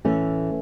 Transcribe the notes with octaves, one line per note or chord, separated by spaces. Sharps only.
A2 E3 A3 C#4